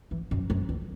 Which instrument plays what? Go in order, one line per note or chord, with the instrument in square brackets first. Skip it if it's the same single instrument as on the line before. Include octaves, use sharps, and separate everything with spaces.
[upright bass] E3
F#2
F#2
E2